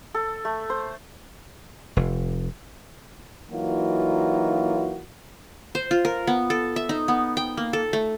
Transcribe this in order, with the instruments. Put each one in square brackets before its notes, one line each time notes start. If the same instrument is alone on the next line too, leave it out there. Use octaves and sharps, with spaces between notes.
[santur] A4
A3
C5
[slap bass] F1
[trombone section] E3 F#3 A#3 D#4 F4 F#4
[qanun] C5
F4
A#4
B3
A4
E5
D#4
B3
G5
A#3
A4
A3